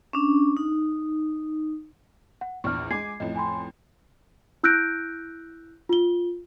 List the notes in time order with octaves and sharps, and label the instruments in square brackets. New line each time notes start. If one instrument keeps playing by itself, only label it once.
[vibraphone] C#4 D4
D#4
[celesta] F#5
[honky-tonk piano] A#1 E2 [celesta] C#6 F6
[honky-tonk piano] G#3 G#5 D6 [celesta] G#6 C7
[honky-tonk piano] A1 F2 [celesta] D#5
[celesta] G#5 B5 C6
E4 E6 F#6 G6 A#6 D7
F4 G7